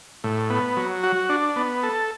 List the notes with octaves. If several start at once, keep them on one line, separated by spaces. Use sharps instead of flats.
A2
B3
F#3
F#4
D4
B3
A4